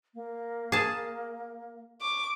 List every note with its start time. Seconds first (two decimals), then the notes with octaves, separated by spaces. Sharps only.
0.15 A#3
0.72 G#4 A5
2.01 C#6 D6